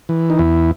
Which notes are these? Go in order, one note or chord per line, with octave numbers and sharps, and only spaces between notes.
E3
D#4
E2 E4